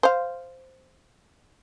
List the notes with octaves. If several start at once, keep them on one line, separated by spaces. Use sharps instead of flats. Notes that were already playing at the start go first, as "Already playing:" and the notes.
C5 F5